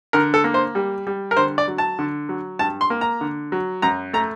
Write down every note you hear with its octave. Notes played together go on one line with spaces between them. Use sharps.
D3 A#4
A4
A#3
C5
G3
G3
A#4
D3 C5
D5
F#3
A5
D3
F#3
G2 A5
C6
A#3
A#5
D3
F#3
F#2 A#5
A3 A#5